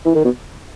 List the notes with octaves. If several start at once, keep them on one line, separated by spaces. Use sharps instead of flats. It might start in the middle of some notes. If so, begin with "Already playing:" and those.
E3
D#3
B2